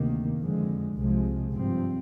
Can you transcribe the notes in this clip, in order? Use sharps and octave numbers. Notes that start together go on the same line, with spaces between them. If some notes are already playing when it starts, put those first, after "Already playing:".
Already playing: D2 C3 D#3 A#3
F2 D3 F3 G#3
C2 C3 F3 G#3
G#1 G2 F3 C4